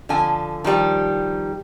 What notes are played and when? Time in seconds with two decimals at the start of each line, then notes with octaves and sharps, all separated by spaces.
0.09 D3 F3 A4 G#5
0.64 D#3 F3 G3 G4